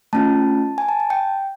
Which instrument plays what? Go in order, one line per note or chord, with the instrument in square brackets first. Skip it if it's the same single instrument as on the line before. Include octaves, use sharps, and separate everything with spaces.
[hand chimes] A3 C#4 F4 A5
G#5
A5
A5
G5